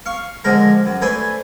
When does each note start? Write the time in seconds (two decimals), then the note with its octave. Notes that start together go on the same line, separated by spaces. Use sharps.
0.06 F5 C#6
0.44 D3 F3 G#3 A#4
0.86 F#2
1.01 A3 D4 B4 C5 G#5